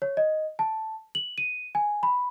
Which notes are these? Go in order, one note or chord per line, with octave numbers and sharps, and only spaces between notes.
C#5
D#5
A5
F#7
D#7
G#5
B5